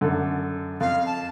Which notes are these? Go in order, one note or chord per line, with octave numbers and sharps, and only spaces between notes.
F#2 D3 A4
F2 F5
A5